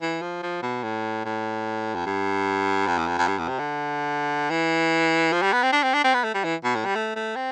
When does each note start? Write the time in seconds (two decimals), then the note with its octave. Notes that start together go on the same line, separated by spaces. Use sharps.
0.02 E3
0.22 F3
0.43 F3
0.62 B2
0.83 A2
1.25 A2
1.95 F2
2.06 G2
2.87 F2
2.98 E2
3.07 F2
3.18 F2
3.28 G2
3.38 E2
3.48 C3
3.59 D3
4.50 E3
5.32 F3
5.42 G3
5.53 B3
5.63 C4
5.72 D4
5.83 C4
5.94 D4
6.04 C4
6.14 B3
6.24 A3
6.34 G3
6.44 E3
6.64 B2
6.75 A2
6.85 G3
6.95 A3
7.16 A3
7.36 C4